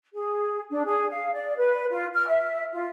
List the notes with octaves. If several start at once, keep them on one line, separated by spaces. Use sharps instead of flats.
G#4
D4
G#4
F5
D5
B4
F4
F6
E5
F4